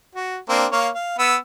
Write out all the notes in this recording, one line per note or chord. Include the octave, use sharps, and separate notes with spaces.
F#4
A#3 C4 D4
A#3 C#5 F5
F5
B3 E6